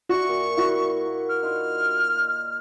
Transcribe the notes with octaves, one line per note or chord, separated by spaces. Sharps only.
F#4 D5 E5 C#6
A#2 G#5
E4 F#4
A#3
F6
D#4 F4